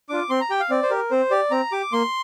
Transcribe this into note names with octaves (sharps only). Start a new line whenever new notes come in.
D4 F4 D6
C4 C6
A#5
G4 G5
F5
C4 D5
C5
G4 A#4
C4 C5
G4 D5
C4 A#5
G4 D6
A#3 C6